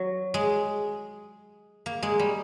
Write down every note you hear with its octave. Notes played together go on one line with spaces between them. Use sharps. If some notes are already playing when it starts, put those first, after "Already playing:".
Already playing: F#3
G#3
A#3
G#3
G3